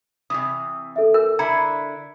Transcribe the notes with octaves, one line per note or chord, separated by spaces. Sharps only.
C3 E3 D#6
A4 E5
A#4
D3 E4 A#5 G#6 C#7